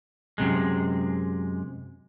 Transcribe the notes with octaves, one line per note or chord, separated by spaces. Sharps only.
F#2 C3 G#3